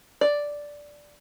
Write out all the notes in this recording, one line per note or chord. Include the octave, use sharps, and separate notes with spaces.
D5